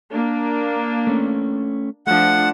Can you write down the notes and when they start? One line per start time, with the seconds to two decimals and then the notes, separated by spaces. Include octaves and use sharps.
0.10 A#3 D4
1.07 A3 C#4
2.07 F3 A3 D4 F#5